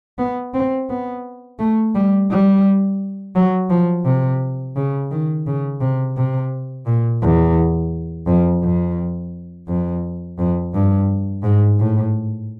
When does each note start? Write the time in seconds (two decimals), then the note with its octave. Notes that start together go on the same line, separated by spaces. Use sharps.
0.19 B3
0.54 C4
0.90 B3
1.59 A3
1.95 G3
2.31 G3
3.36 F#3
3.70 F3
4.05 C3
4.76 C#3
5.11 D#3
5.47 C#3
5.81 C3
6.17 C3
6.86 A#2
7.22 E2
8.27 F2
8.63 F2
9.68 F2
10.39 F2
10.74 G2
11.43 G#2
11.80 A2